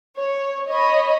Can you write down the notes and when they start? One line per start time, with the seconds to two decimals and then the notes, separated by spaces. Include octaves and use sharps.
0.18 C#5
0.69 C#5 D#5 B5